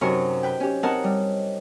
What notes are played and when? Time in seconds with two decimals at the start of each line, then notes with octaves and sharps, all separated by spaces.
0.01 F#2 C3 D#4 A#4 C#6
0.43 B4 G5
0.60 C#4 G4
0.83 C4 D#4 A#4 C#5 F#5 A5
1.04 G3